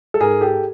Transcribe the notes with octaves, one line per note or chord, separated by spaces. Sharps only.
A4
G#2 G#4 A#4
G4 A4